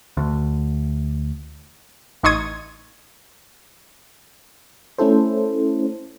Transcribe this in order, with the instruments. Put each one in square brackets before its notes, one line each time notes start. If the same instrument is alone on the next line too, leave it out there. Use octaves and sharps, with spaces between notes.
[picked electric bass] D2
[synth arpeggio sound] A1 D#4 C6 C#6 D#6 G#6
[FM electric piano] A3 C#4 E4 A4 C5